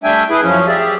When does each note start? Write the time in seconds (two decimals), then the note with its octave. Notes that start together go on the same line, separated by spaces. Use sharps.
0.04 G3 A3 D4 E5 G5 G#5
0.30 E4 G#4 B4
0.43 F#2 F3 C#4
0.68 G4 G#4 D5 E5